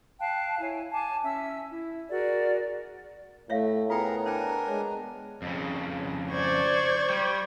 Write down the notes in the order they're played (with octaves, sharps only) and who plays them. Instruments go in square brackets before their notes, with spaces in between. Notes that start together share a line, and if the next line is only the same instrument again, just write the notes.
[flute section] F5 G5 A5 F#6
E4 C#5 G#5
G#5 A5 D6
C#4 E5 E6
E4
F#4 G#4 A#4 D5
[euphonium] A2 [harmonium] A3 [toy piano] C#5 E5 F5
[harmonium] B3 A#5 [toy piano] F4 G5 [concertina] G#4 A#4
[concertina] D4 A#4 G#5 [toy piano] C5 G5
[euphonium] G#3 [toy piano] C#5
[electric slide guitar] F2 C#3
[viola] C5 D5 [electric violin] C#6 G#6
[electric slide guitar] G3